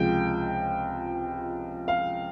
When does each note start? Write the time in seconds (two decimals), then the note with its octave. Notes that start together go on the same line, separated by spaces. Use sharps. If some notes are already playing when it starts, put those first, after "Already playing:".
Already playing: C#2 C3 F3 G#3 G5
1.88 F5